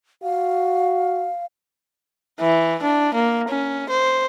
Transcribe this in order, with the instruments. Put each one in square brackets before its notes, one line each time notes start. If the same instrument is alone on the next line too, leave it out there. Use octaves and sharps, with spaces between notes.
[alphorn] F#4 [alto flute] F5
[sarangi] E3
D4
A#3
C#4
C5